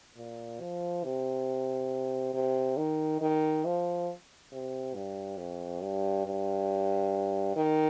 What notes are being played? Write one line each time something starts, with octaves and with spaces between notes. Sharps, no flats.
A#2
F3
C3
C3
D#3
D#3
F3
C3
G2
F2
G2
G2
D#3